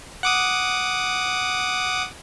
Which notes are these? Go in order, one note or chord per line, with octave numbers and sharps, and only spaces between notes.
F#5 D6 D#6